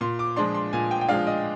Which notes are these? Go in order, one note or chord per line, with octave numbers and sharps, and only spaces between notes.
A#2 C6
D6
F3 G#3 D4 C6
C6
A#2 G#5
G5
G5
F3 G#3 D4 F5
D#5